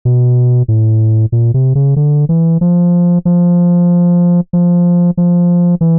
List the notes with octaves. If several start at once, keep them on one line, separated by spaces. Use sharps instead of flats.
B2
A2
A#2
C3
C#3
D3
E3
F3
F3
F3
F3
E3